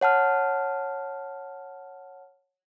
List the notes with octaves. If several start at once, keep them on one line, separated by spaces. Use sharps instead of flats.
C#5 F#5 A5 F6